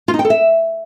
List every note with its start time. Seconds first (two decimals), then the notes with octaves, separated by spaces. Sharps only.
0.08 F4
0.14 D#4
0.19 G5
0.25 A4
0.30 E5